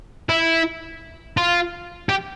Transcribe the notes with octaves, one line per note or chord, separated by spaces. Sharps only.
E4
F4
G4